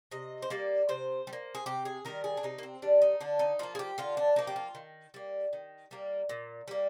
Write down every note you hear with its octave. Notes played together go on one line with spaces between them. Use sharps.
C3 D#5
C5
G3 A#3 D5
C3 C5
G3
A#3
G#4
C3 G4
G#4
D#3 G3 A#4
G#4
D4
C3 D#4
A#3
C4
D#3 G3 D4
D#4
D3 D4
D#4
F3 A#3 F4
G#4
G4
D3 F4
D4
F3 A#3 D#4
G4
F4
D#3
G3 A#3
D#3
G3 A#3
A#2
G3 A#3